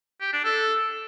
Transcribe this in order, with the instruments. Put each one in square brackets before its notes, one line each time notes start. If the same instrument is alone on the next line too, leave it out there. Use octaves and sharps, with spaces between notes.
[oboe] G4
D4
A4